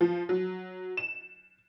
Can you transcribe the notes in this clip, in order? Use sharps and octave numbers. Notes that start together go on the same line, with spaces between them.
F3
F#3
E7